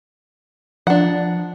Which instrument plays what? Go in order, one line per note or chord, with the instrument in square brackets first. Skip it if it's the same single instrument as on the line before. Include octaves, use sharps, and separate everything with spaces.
[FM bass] F3 [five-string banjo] D4 F#5